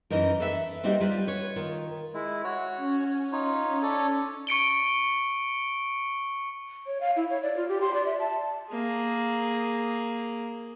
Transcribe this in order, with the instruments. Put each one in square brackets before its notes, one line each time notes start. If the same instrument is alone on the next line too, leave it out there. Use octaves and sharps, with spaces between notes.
[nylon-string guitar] F#2 E3 D#4 A#4
A4 B4 E5
G3 C4 D#4 F#4 G4
G3 F4 B4
B4 C#5
D#3 F4
[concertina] G#3 E4
F#4 C#5
[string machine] C#4
[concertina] D#4 F4 C#5
A4 C#5 D5
[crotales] C#6 C#7 D7 G7
[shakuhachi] C#5
F5
E4
C#5
D5
F4
G4
C6
D5
E5
A5
[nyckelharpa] A#3 G#4